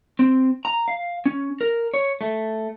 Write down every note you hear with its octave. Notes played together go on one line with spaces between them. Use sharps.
C4
A#5
F5
C#4
A#4
C#5
A3